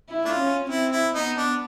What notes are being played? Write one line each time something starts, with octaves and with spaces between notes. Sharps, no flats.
E4
A3 D4 F4
C#4
C4 E4
E4
B3 D#4
D4